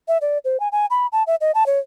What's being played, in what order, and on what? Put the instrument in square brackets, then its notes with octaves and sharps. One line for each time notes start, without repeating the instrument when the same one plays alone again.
[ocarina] E5
D5
C5
G#5
G#5
B5
A5
E5
D#5
A5
C#5